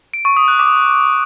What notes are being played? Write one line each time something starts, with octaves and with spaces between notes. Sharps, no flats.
D7
C#6
D#6
F#6
D6